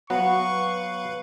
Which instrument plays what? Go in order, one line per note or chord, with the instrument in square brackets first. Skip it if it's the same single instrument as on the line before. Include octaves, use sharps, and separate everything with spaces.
[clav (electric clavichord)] F#3 B3 F#4 [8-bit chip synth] B4 F5 B5 [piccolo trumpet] C#6